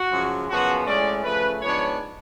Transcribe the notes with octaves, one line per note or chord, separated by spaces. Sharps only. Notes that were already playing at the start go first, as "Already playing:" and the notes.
Already playing: F#4
F#2 C#3 F3 G#3
F#2 C#3 F3 B3 F#4
A2 G#3 C#4 D5
C#3 F3 A3 B4
G#2 F3 B3 D4 C#5